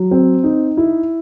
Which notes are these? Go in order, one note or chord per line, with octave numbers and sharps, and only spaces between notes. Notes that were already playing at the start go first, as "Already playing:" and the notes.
Already playing: F#3
C4
D#4
E4